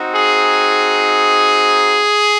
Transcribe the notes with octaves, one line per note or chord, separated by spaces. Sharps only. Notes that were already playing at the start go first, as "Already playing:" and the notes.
Already playing: C4 D#4 F#4
G#4